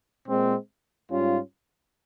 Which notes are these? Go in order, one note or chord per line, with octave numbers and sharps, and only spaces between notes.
A#2 G#3 C4
G#2 G3 C#4 F4